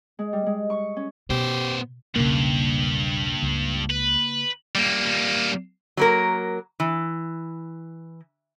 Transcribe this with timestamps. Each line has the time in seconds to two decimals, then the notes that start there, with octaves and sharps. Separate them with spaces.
0.19 G#3
0.33 G3
0.46 G#3
0.70 C#6
0.96 C#4
1.30 B2 B3 G4 C5
2.16 E1 B1 G2 C#3 A#3
3.42 C#2
3.90 B4
4.75 G3 A#3
5.97 F#3 A#3 A#4
6.80 E3